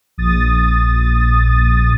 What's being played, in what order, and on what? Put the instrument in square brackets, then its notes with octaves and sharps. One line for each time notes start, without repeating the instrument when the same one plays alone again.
[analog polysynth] A#1 D#6 A6